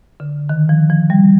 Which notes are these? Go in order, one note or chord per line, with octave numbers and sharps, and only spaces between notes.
D3
D#3
F3
F3
G3